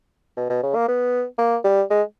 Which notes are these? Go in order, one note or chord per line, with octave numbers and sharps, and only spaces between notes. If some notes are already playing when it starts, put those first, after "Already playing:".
B2
B2
C#3
A#3
B3
A#3
G3
G#3